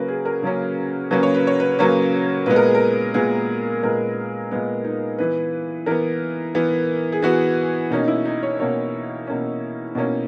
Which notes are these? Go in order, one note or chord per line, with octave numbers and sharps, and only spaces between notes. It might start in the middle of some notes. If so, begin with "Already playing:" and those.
Already playing: C#3 F#3 A#3 C#4 A#4 B4
G#4
A#4
C#3 F#3 A#3 C#4
C#3 F#3 A#3 C#4 B4
C#5
B4
C#5
B4
C#3 F#3 A#3 C#4 B4
A#2 G#3 B3 B4
A#4
G#4
A#4
A#2 G#3 B3 G#4
A#2 G#3 B3 A#4
A#2 G#3 B3
D#4
E3 B3 B4
E3 B3 A#4
E3 B3
G#4
E3 B3 F#4
B2 A#3 C#4 D#4
E4
D#4
C#5
B2 A#3 C#4 C#5
B2 A#3 C#4
B2 A#3 C#4